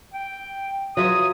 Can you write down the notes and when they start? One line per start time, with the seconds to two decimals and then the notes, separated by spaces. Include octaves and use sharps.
0.14 G5
0.97 F#3 F4 E5 D#6